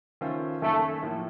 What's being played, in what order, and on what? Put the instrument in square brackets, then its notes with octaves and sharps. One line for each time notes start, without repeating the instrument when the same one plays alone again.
[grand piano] D#3 A3 C#4 F4 C5
[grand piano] F#2 D#3 A#3 C#4 [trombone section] A3
[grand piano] A2 F3 A#3